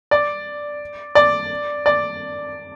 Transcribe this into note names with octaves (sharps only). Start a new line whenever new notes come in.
D5
D5
D5